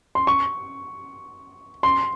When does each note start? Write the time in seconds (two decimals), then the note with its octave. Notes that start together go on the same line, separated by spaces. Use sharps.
0.15 C6
0.27 C#6
1.83 C6